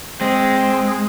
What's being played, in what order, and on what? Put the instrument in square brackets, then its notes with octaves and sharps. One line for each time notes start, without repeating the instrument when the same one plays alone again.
[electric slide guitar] G#3 [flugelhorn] C4